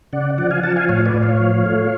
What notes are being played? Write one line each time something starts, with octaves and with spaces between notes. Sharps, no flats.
C#3 D5 F#5
F3 D5 F#5
F5 G#5
F3 F#5 A5
F5 G#5
A2 C#5 F5
B4 D5
A2
C#5 F5
F3
A3